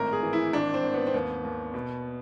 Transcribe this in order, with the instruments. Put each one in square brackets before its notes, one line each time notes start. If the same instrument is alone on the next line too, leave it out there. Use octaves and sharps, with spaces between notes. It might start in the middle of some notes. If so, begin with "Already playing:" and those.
Already playing: [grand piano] G#1 A2 A#4
G#4
E3
E4
G#1 D4
C4
G#1
B3
C4
D#2 B3
D#2
B2